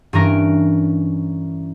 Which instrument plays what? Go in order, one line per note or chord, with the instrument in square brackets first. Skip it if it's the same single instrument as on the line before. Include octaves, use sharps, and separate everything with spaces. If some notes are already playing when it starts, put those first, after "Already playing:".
[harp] G2 E3 C#4 A#4 A#6 D7